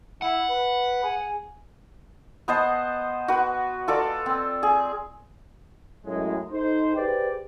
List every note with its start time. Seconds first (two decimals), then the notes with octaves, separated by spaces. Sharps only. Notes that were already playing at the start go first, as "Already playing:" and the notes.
0.22 E4 F#5
0.49 B4
1.04 G#4
2.48 B3 C5 D#5 A5
3.28 F#4 B4
3.88 F4 A4 D5
4.26 C4
4.63 G#4
6.05 F#2 A2 G#3
6.51 D#4 A4 C5
6.95 G4 G#4 B4 C5 D5 G5